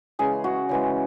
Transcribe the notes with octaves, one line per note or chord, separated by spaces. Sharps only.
C#3 E3 G#3 G#4
F#4
C#3 E3 G#3